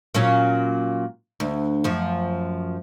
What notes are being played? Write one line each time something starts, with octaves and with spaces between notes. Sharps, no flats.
A#2 F#3 C#4
D2
F#2 F3